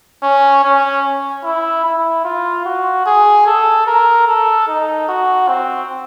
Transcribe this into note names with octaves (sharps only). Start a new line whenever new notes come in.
C#4
C#4
E4
E4
F4
F#4
G#4
A4
A#4
A4
D#4
F#4
C4